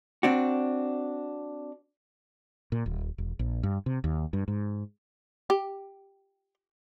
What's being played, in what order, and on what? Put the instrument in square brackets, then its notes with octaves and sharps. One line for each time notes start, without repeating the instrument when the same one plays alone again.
[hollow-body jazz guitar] C4 D4 F#4
[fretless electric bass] A#2
D#1
E1
A#1
G2
C3
D#2
G2
G#2
[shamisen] G4